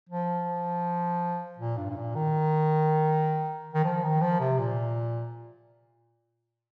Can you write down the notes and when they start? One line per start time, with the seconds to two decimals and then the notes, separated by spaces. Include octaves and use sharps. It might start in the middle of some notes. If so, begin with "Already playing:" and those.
0.09 F3
1.58 A#2
1.77 G2
1.90 G2
1.97 A#2
2.15 D#3
3.74 D#3
3.84 F3
4.04 D#3
4.22 F3
4.40 C3
4.59 A#2